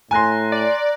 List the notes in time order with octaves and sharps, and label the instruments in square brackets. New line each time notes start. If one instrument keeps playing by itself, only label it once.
[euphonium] A2 [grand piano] G#5 C6 [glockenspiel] A#5 F#6 A#6
[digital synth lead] D5